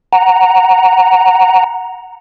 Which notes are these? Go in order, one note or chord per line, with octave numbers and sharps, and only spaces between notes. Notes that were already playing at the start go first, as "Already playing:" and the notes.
F#5 A#5